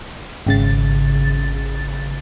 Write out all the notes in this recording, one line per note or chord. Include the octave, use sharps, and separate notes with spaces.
G#1 C#3 A6